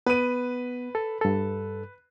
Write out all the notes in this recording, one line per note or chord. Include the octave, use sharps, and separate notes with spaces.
B3 B4 D#7
A4
G2 A4